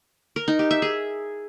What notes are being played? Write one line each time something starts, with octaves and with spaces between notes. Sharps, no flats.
A#4
D#4
G4
E5
G#4